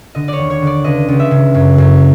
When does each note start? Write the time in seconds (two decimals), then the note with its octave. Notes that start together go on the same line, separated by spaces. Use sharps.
0.15 D3 D#5
0.28 C#5 D5
0.38 D#2
0.50 C#5
0.62 D3 D5
0.84 C#2 D#5
1.08 C#2
1.20 E5
1.31 C#3
1.54 F#2
1.78 F#2